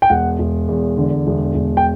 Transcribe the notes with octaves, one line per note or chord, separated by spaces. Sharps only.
G5
E1 F#5
E1
E2
D3
E1
E1
G5